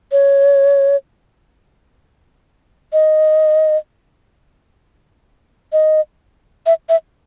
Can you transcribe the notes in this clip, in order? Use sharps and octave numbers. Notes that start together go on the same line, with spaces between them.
C#5
D#5
D#5
E5
E5